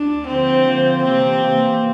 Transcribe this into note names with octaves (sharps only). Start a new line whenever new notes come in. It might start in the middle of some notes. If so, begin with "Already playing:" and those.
Already playing: D2 D4
D3 F3 A#3 C4 F4 C5
D3 F3 A#3 F4 C5
C3 E3 A#3 C4
C3 E3 A#3